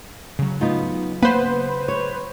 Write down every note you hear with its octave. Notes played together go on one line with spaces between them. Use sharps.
C#3 F#3
B3 D#4 F4
A#3 B3 B4 C5
C#5